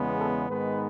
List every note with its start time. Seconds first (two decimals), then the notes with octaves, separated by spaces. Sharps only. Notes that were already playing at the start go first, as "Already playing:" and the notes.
Already playing: E2 C#3 G#3 B3
0.19 A4
0.49 G#2 D#3 G#3 B3 B4